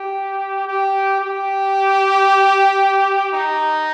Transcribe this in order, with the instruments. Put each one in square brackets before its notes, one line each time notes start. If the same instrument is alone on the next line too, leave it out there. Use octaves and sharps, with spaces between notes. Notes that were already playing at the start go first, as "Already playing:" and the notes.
Already playing: [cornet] G4
G4
G4
D#4